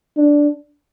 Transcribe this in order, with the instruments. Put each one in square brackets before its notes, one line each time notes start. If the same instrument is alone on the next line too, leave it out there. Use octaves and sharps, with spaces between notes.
[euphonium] D4